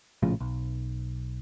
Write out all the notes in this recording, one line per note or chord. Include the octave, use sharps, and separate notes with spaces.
A#1 A2 C#3 F3
B1